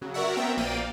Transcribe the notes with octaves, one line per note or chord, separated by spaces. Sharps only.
C#3 F#3
F#4 A#4 C#5 D5 E5 F#5
B3 C4 E5 G5 A#5
A#1 A#3 D5 G5 D#7
F5